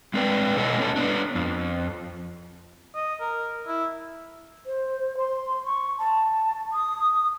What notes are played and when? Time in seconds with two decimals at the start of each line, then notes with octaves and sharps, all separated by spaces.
0.14 G#3 C4 B4 D5 G5
0.56 B2 A4 C#5 D#5 F#5 G#5
0.78 B3 C#4 D4 A4
0.96 B3 D4
1.35 F2
2.95 D#5
3.21 A#4
3.67 E4
4.66 C5
5.18 C6
5.65 C#6
5.99 A5
6.73 D#6